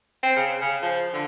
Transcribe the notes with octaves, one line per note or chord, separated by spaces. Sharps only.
C4
C#3
C#3
F3
D3